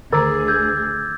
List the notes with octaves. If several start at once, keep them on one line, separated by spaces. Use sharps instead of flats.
D2 D3 D#3 G#4 A#5 D6 E6 A6
E6 G6 G#6